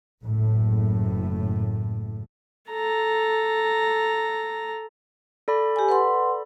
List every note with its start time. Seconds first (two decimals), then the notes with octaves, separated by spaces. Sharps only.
0.23 F#1 A2
2.71 A4 A#5
5.48 A4 D5 B5
5.76 G4 G#5
5.89 B4 F#5 C6